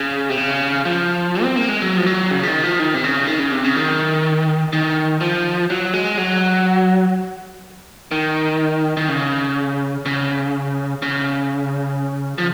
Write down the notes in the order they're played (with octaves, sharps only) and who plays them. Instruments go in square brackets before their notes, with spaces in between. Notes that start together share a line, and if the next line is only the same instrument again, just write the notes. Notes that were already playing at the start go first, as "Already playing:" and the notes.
Already playing: [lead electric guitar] C#3
C3
C#3
F3
C4
A#3
G#3
F#3
F3
F#3
C#3
F3
D#3
F3
D#3
C3
C#3
D#3
C#3
C3
C#3
D#3
D#3
F3
F#3
G#3
F#3
D#3
D#3
C#3
C#3
C#3
F3